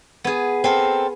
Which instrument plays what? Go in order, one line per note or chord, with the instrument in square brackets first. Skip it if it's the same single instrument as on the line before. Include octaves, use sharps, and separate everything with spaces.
[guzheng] B3 G#4
[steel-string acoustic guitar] C4 A4 A#4